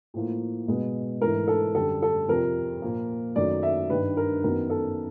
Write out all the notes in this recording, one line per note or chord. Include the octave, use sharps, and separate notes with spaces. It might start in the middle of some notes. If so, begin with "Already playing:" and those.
A2 F3 A#3
B2 G#3 B3
G#2 E3 A3 A#4
A4
F#2 D3 G3 A4
A4
F2 C3 F3 A#4
A#2 F3 A#3
F#2 D#3 F#3 A3 D5
E5
G2 D#3 G3 B4
A#4
F#2 D#3 F#3 B3 A#4
A4